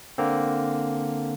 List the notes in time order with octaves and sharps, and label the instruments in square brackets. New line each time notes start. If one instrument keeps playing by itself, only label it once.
[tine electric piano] D3 A#3 C4